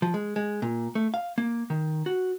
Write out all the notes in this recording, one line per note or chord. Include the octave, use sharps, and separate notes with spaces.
F3
G#3
G#3
A#2
A3
F5
A#3
D#3
F#4